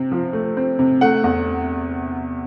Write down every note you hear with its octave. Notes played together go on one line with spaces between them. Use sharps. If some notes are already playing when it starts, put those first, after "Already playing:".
Already playing: C3 C4
F3
A3
C4
C3
A3 F#5
E2